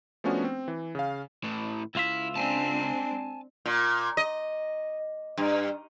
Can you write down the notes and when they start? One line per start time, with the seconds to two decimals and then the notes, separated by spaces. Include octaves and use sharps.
0.24 F3 A3 B3 C#4 D4 F#4
0.44 C4
0.68 E3
0.95 C#3 F5
1.44 A2 E3
1.95 C#2 E4 F4 E5
2.36 G#3 C4 D4 G#5 A5
3.66 A#2
4.17 D#5
5.37 G2